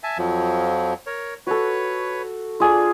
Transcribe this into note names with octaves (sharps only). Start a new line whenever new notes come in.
E5 G#5 A5
F2 F3 F#3
A#4 C#5
F#4 A4 B4 C#5
D4 F4 G#4 D5